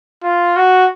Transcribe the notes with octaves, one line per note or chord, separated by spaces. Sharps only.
F4
F#4